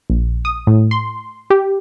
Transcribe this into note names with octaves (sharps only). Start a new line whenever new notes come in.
A#1
D#6
A2
C6
G4